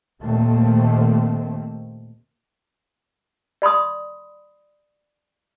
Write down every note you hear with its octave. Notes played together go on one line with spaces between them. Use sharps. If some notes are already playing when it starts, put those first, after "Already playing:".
D#2 A#2 D#3 A3 A#3 C4
D5 B5 C6 D#6